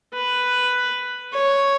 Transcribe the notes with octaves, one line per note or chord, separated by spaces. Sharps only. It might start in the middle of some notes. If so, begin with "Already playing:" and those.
B4
C#5